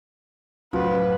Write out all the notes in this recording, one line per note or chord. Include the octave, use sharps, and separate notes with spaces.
C#2 F#2 A2 F3 F#4 B4